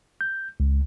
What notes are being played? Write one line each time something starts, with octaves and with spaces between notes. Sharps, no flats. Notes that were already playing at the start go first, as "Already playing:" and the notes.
G6
C#2